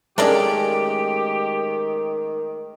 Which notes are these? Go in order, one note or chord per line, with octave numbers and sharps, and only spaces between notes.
D#3 G#3 A3 C#4 D4 G4 A#4 D5